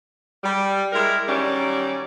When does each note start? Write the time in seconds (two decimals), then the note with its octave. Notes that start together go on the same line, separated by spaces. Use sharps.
0.44 G3
0.92 G#3 E4 A#4
1.28 D#3 F#3 G3 C#4 D5